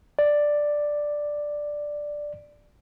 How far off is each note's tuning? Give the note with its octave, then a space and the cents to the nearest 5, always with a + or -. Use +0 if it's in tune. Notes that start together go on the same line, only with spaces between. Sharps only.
D5 +5